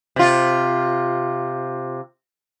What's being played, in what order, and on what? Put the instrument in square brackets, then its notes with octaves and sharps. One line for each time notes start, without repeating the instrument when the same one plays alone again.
[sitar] C3 F4